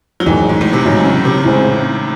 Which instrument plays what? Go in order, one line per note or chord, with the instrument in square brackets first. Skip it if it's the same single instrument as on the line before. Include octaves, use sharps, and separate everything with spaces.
[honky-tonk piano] F#3
[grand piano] A1 G#2 D#3 G#3 [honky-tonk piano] E3
[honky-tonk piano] G#2
A2
C3
[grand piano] G#2 F#3 C#4 [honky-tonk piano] C#3
[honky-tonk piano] C#3
C3
[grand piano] A2 G#3 C4